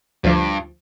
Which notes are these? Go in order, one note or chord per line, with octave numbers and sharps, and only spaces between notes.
D2 G2 F3